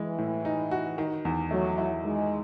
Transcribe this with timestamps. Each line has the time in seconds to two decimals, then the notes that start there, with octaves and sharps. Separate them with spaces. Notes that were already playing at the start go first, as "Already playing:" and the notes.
Already playing: E3 G#3
0.18 A2
0.45 D#4
0.71 F#4
0.98 D#3
1.25 E2
1.51 F#3 A3
1.78 E4
2.04 D#3 G#3